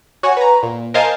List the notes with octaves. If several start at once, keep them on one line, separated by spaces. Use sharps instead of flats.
F#4 C#5 F#5 G#5
B4 A#5
A#2
A#4 C5 D#5 F5 G#5 A5